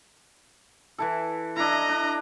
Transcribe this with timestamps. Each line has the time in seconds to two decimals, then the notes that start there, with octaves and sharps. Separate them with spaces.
0.98 E3 E4 A4
1.56 D4 E4 D#5 A#5
1.89 D4